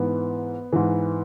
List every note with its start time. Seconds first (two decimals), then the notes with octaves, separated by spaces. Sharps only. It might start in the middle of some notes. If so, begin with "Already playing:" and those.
Already playing: G#2 E3 B3
0.73 G#2 E3